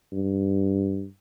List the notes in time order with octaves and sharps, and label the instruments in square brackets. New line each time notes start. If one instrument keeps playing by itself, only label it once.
[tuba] G2